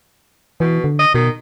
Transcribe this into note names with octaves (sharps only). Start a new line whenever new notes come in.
B2 E3
D3
D#5
B2 D#3